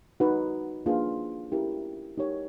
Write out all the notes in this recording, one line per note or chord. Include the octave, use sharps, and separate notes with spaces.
D#4 F#4 B4
A#3 D4 F4 G#4 B4
C#4 E4 G4 A#4
D#4 G4 A#4 C#5